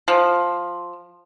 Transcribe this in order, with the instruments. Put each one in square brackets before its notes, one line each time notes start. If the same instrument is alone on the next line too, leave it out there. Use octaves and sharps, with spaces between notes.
[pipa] F3